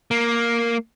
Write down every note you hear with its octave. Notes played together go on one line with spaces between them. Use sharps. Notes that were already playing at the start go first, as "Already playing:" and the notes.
A#3